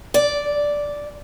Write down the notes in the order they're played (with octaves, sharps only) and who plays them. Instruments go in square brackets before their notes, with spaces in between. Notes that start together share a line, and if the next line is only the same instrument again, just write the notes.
[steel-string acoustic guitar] D5